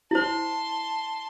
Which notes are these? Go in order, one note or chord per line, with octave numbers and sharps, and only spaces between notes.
E4 C5 A5 C6